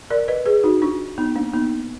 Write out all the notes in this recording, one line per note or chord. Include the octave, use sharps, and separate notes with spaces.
A#4 D5
B4 D#5
G#4 B4
D#4 F#4
D4 F4
B3 D#4
A#3 D4
B3 D#4